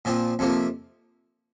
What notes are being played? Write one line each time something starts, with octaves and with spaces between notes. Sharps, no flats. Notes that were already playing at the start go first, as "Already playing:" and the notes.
A#2 F3 C4
F2 C3 F3 A#3